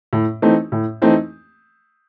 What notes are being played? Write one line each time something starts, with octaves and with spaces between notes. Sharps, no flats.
A2
E3 A3 C4 D#4
A2
E3 A3 C4 D#4